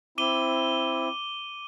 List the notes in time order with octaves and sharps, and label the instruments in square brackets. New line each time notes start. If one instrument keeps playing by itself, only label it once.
[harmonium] C4 E4 [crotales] D6 D#7 G7